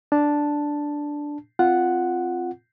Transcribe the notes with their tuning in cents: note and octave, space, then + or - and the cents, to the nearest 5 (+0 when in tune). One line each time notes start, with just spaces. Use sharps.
D4 +0 A5 +0
C4 +0 F4 -5 F#5 +0